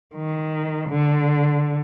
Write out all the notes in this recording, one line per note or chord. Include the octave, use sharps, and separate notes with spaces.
D#3
D3